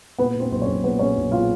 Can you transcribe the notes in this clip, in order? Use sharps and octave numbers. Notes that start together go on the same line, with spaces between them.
A#2 B3 B4
A#2
C4 C5
B1 C5
C#4 C#5
B1
A#2 B3 B4
A#2 C#4 C#5
B1
A#2 F4 F5